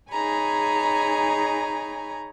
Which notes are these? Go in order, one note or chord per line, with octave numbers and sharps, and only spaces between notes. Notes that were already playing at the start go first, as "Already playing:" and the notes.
D#4 G#4 C#5 G#5 A#5 B5